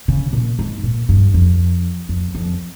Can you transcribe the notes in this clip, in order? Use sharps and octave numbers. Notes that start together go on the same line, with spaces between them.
C#3
A#2
G#2
A#2
G2
F2
F2
F2